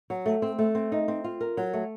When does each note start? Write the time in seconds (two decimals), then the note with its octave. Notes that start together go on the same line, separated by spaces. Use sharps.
0.10 F#3
0.26 A3
0.42 C4
0.59 A3
0.75 C4
0.92 D#4
1.08 C4
1.24 F4
1.41 A#4
1.57 F#3
1.74 A3